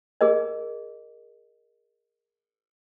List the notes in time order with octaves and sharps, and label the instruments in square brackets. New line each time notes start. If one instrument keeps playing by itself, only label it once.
[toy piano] G#4 A#4 D#5